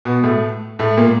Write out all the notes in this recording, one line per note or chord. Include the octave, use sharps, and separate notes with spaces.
B2 B3
A2 A3
A2 A3
A#2 A#3